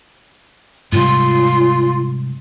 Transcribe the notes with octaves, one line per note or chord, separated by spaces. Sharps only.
G#2 C3 G3 F4